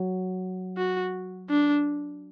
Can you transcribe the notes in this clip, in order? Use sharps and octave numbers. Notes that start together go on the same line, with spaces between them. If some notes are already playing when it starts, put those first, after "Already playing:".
Already playing: F#3
F#4
D4